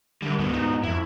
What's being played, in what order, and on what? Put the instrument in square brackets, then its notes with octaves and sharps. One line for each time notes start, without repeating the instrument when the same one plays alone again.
[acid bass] D3 [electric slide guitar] G3 A#4
[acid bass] D2 [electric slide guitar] G#2 B3 F#4
[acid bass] D#4
[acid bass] F2 [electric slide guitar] E4